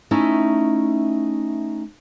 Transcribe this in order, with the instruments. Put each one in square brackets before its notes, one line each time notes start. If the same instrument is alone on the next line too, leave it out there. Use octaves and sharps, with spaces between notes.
[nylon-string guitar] A3 C#4 D#4 E4 E5